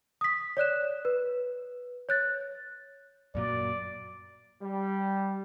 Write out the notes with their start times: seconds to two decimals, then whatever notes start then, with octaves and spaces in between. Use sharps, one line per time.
0.21 D#6 B6
0.57 C#5 D5 F#6 E7
1.05 B4
2.09 C#5 F#6 A6
3.35 F#2 A#2 F#3 D5
4.62 G3